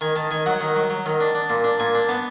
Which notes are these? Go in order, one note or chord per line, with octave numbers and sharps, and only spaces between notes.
D#3 G#5
D#3 A5
D#3 G#5
F#3 F#5
D#3
F#3
F#3
D#3
D4
D4
A#2
D4
A#2 G#5
D4
B3 A5